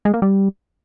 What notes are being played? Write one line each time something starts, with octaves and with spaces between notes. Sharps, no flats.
G#3
A#3
G3